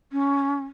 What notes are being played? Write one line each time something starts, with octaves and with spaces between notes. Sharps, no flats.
C#4